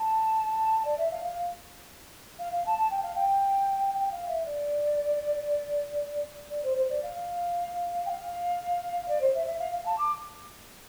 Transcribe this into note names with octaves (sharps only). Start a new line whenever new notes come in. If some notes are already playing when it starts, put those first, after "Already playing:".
Already playing: A5
D5
E5
F5
F5
F5
F5
A5
A5
G5
F5
G5
G5
F5
E5
D5
D5
C5
C5
D5
F5
G5
F5
D5
C5
E5
E5
F5
F5
A5
D6